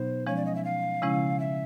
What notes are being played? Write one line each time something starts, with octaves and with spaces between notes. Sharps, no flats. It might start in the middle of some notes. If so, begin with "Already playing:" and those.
Already playing: B2 F#3 B3 D#4 C5
F3 G#3 C#4 C#5
D5
D#5
E5
F5
C#3 F3 G#3 C#4 E4
E5